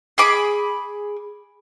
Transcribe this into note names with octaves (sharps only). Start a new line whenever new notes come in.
G#4 B5 D6